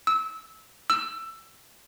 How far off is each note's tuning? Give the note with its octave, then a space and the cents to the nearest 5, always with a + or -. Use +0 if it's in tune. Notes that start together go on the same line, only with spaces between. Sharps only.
E6 -25
E6 +15